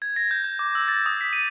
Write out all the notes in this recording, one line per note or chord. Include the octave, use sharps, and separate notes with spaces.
G#6
A#6
G6
G6
D6
E6
A6
D#6
B6
D#7